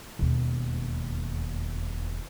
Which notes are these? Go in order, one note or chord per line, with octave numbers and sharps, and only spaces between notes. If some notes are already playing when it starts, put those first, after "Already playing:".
E1 D#2